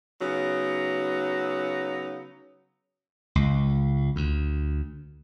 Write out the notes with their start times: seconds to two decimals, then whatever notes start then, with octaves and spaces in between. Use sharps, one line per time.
0.20 C#3 F#3 B3 D#4
3.35 C#2
4.16 D2